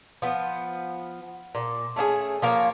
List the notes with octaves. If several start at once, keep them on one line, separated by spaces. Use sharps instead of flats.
F3 B3
A#2
A3 C#4 E4 G#4
F3 A#3 A#4 C#5